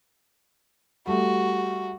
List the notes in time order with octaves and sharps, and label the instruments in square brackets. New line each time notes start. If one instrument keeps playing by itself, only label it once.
[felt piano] G3 A3 [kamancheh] F#4